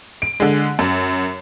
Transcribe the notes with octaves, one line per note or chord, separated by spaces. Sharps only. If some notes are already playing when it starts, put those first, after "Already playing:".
D7
D3 G#3
F#2